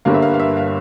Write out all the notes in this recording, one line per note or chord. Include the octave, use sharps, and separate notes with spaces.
G1 G2 D3 G3 A#3 F5
E5
F5
F5
E5
F5